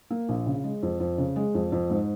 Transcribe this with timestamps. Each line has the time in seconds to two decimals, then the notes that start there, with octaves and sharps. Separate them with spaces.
0.10 A#3
0.28 A#1
0.46 C#3
0.64 G#3
0.83 F2
1.00 F2
1.18 C#3
1.36 G#3
1.54 F2
1.72 F2
1.90 G#2